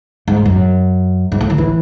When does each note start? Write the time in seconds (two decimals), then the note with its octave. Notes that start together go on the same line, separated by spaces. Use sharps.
0.28 G#2
0.46 F#2
1.32 G#2
1.41 A2
1.50 D#3
1.58 E3